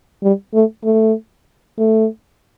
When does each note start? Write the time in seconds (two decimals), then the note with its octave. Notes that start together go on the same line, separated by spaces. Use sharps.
0.23 G3
0.54 A3
0.85 A3
1.78 A3